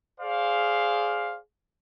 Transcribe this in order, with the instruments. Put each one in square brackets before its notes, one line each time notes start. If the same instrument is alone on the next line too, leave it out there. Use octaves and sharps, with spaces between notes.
[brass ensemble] G#4 C5 D5 F5